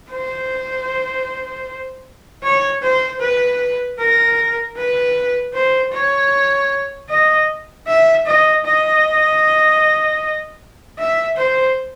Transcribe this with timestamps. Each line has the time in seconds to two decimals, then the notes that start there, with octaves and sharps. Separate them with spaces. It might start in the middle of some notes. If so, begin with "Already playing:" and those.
0.11 C5
2.44 C#5
2.83 C5
3.21 B4
3.99 A#4
4.77 B4
5.54 C5
5.93 C#5
7.10 D#5
7.88 E5
8.26 D#5
8.65 D#5
10.99 E5
11.37 C5